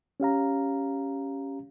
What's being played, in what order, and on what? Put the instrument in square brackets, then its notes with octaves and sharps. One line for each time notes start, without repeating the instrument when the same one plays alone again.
[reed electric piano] C#4 G4 F5 A#5